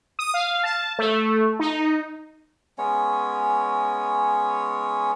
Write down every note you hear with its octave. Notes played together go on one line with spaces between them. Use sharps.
D#6
F5
A5
A3
D#4
G#3 B3 C#4 C#5